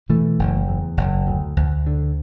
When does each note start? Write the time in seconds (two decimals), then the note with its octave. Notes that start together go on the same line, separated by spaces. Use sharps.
0.09 B2 E3 A3
0.39 F#1
0.68 E2
0.97 F#1
1.27 D2
1.56 D2
1.86 D3